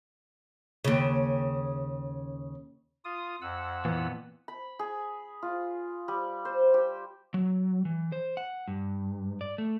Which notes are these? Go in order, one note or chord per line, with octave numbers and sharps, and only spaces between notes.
D#2 C#3
F4 D#6
F2 F#5 E6
A#2 E3 B3
B5
G#4
F4
G3
C5
G4
F#3
E3
C5
F#5
G2
D5
A3